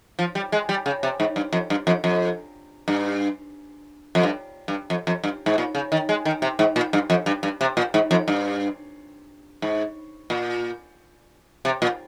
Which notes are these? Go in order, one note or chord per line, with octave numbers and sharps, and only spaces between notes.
F3
G3
G#3
G3
C#3
C3
G#2
G2
F2
G2
F2
F2
G2
F2
G2
G2
F2
F2
G2
G#2
A#2
C#3
D#3
G#3
D#3
C3
G#2
A#2
G2
F2
G2
G2
C3
A#2
G#2
F2
G2
G#2
A#2
C3
A#2